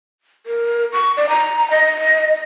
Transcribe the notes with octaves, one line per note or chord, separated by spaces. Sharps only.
A#4
C#6
D5
A#5
D#5